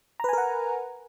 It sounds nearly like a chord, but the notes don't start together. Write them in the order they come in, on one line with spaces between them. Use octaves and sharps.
A#5 B4 G#5 A#4 F#5